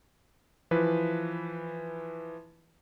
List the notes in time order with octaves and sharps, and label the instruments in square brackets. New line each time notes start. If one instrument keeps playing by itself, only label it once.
[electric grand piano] E3 F3 B4